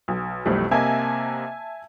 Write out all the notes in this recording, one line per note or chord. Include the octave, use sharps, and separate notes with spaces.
B1
B1 F2 E3 G3 A3 C4
C3 A#3 D#5 E5 G#5 A5